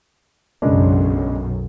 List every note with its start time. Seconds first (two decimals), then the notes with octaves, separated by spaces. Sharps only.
0.62 B1 F#2 C#3 G#3 D4